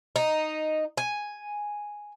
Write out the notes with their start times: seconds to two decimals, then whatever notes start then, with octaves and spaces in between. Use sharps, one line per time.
0.16 D#4
0.97 G#5